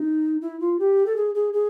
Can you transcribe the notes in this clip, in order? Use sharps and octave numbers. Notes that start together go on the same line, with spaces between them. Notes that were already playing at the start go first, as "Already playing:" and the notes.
Already playing: D#4
E4
F4
G4
A4
G#4
G#4
G#4